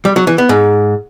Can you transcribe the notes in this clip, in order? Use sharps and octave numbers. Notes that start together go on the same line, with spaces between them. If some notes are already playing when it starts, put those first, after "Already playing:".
G3
F#3
E3
B3
G#2